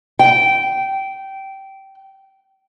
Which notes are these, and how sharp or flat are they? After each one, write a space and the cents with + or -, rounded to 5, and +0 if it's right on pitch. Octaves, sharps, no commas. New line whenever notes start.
G5 -15